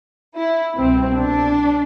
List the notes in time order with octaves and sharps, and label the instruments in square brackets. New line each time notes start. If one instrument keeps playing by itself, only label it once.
[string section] E4
C2 B2 C4
D4